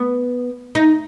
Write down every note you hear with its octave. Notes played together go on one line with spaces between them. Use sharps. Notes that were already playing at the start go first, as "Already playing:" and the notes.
Already playing: B3
D#4